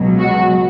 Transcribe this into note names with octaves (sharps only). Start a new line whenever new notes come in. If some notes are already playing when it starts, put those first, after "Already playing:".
Already playing: C#2 B2 F#3
F#4